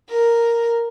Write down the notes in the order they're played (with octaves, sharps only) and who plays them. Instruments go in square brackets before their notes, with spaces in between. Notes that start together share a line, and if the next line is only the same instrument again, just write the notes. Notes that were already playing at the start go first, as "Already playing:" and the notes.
[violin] A#4